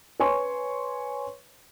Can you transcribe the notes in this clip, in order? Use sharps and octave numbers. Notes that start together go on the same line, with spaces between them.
B4 C#5 G#5 C6 C#6